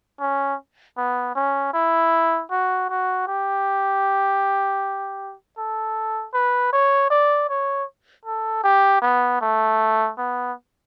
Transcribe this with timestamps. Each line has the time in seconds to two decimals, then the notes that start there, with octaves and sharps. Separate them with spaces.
0.20 C#4
0.97 B3
1.35 C#4
1.73 E4
2.51 F#4
2.90 F#4
3.28 G4
5.58 A4
6.34 B4
6.73 C#5
7.11 D5
7.50 C#5
8.25 A4
8.64 G4
9.02 B3
9.41 A3
10.18 B3